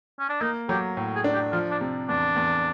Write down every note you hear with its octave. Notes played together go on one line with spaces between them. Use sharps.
C#4
D4
A#3 D#4
F#3 G4
A2
G#4
D4
G4
F3 F4
D4
C3
E2 D4
E2